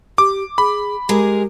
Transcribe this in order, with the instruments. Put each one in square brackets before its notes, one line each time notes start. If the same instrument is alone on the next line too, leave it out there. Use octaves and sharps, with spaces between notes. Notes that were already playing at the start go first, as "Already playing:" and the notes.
[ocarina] G4 [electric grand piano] D6
[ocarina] G#4 [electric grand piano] B5
[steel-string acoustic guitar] G#3 G#4 A#4 [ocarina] G4